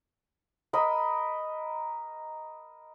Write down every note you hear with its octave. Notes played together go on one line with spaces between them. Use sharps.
A#4 D#5 B5